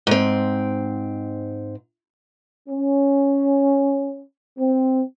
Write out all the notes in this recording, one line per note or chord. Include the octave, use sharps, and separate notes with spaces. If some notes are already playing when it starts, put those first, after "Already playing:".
G#2 C4
C#4
C4